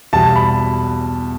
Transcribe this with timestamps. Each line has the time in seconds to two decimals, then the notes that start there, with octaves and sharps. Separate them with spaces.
0.13 E2 B2 G3 A5
0.36 B5